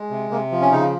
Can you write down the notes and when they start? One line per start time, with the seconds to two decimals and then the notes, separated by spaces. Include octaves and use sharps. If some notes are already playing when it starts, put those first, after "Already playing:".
Already playing: G#3
0.11 C3
0.31 C3 A#3
0.51 F3
0.61 C#4
0.72 C#3 D#4